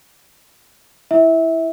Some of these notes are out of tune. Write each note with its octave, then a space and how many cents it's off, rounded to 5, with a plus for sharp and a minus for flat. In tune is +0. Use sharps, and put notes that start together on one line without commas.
E4 +0 E5 -20